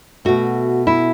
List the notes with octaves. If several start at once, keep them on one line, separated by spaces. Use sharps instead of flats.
B2 A3 F#4
E4